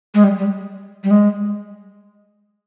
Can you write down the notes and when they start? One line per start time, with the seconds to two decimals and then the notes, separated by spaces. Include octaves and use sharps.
0.14 G#3
0.24 G3
0.38 G3
1.04 G3
1.11 G#3